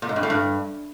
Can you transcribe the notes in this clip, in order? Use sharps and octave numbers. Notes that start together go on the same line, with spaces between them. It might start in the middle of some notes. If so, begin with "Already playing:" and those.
A#2
G#2
G2
A2
G2